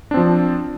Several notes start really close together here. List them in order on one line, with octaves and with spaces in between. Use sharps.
D4 C4 F3